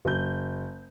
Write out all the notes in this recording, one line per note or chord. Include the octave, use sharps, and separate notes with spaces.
F#1 G6